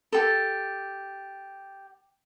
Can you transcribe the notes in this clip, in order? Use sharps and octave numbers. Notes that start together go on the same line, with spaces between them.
G4 A4